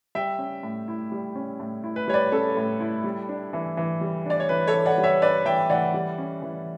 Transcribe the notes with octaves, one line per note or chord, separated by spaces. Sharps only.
G3 E5 G5
C#4
A2
E4
G3
C#4
A2
E4
B4
G3 C#5
B4 D5
C#4 A4
A2
E4
G3
D4
E3
E3
G3
D4 D5
C#5
E3 B4
A4 C#5
E3
D5 F#5
G3
C#5 E5
D4 B4 D5
E3 E5 G5
E3 D5 F#5
G3
C#4
E3